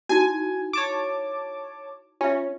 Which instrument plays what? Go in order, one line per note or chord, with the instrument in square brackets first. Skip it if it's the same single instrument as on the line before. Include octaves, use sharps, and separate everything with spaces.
[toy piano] D#4 E4 F#4 [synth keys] G#5
[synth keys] C#5 A5 D6
[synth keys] C#4 [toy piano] F4 E5